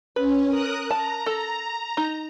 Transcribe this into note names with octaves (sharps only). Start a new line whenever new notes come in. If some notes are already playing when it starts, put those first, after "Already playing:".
C#4 B4
A#4 D#6 F#6
A5 A#5
A4
D#4